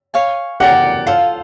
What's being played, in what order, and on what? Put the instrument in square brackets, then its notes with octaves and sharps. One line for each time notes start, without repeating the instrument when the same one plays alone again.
[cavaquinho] C#5 F5 G#5
[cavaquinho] G4 A#4 D5 [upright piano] F#5
[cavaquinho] F4 A4 C5 [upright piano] F5